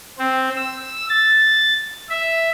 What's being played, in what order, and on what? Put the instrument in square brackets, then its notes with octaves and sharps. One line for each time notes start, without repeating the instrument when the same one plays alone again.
[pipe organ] C4
E6
A6
E5